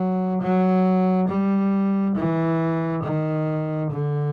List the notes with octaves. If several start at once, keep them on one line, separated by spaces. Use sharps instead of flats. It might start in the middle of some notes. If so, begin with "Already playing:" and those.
Already playing: F#3
F#3
G3
E3
D#3
D3